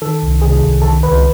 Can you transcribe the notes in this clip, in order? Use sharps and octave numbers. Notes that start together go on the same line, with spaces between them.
D#3 A4
C2
C3 G#4
C2
D#3 A4
C#2 B4